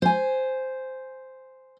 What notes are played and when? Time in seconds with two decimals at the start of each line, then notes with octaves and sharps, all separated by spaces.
0.02 C5 G#5